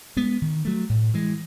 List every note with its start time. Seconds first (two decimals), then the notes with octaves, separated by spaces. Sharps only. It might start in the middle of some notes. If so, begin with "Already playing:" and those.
0.17 G#3 B3
0.42 D#3
0.65 F#3 A3
0.89 A2
1.14 E3 G#3